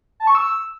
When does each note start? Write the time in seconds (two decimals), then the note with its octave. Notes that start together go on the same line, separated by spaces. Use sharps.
0.20 A5
0.27 C#6
0.35 E6